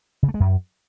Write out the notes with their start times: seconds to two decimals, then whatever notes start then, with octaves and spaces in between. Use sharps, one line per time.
0.23 C#3
0.28 A3
0.34 G#3
0.40 F#2